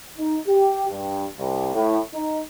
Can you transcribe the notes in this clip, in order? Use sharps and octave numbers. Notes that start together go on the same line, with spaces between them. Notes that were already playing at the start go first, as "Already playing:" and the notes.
D#4
G4
G2
C2
A2
D#4